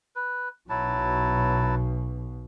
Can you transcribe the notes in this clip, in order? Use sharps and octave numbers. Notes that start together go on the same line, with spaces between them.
B4
B1 B2 F#3 E4 A5